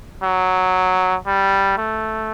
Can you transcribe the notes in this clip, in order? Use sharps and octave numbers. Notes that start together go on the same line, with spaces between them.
F#3
G3
A3